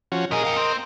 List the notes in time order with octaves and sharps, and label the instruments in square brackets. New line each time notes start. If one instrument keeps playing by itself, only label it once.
[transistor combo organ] F3 C#4 F#4
[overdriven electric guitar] A#2 G#4 [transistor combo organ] A#4 D#5
[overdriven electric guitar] F5 G5
C4